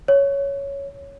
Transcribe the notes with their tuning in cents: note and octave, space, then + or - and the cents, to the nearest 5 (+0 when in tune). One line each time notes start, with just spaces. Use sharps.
C#5 +5